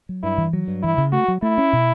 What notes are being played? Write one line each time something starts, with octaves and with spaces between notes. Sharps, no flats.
F#3
G2 E4
E3
F#3
G2
E3 E4
C#3
A3 F#4
F#3
A3 E4
C#4
B2